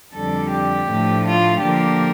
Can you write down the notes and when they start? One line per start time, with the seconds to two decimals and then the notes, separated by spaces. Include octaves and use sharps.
0.13 F2 D3 G3 A4
0.50 G4
0.88 A2 F3 A3 D4
1.25 F4
1.62 D3 F3 A#3 G4